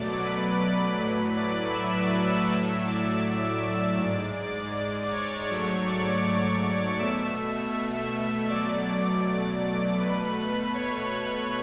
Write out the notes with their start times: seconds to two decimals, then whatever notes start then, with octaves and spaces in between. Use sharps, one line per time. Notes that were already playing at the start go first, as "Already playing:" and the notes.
Already playing: B2 F#3 A3 D5 D6
0.22 B4 B5
0.98 A2 F#3 A3
1.36 D5 D6
1.73 E5 E6
2.48 A2 F#3 A3
2.86 D5 D6
3.60 D5 D6
3.99 G#2 G#3
4.35 D5 D6
5.11 C#5 C#6
5.48 G#2 F#3 A3 C#5 C#6
5.86 D5 D6
6.99 B2 A3 E5 E6
7.74 E5 E6
8.48 B2 F#3 A3 D5 D6
9.99 B2 A3 B4 B5
10.74 C#5 C#6